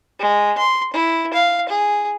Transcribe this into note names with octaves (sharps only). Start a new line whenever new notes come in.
G#3
C6
E4
F5
G#4